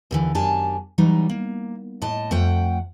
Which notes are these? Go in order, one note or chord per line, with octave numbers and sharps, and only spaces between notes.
D#2 D3 E3
F#2 D4 G4 G#5 A5
E3 F#3 G3 D#4
A#3
A2 D#5 A5
F2 A3 F#5 G5